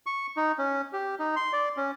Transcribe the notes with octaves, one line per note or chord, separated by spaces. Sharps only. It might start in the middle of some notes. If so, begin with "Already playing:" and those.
C#6
D#4
C#4
G4
D#4
C6
D5
C#4